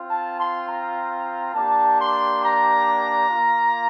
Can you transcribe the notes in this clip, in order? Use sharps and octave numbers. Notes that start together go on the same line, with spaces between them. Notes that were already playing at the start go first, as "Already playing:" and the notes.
Already playing: C4 F4
A5
C6
A#5
A#3 D4 G4 A5
C6
A#5
A#3 F4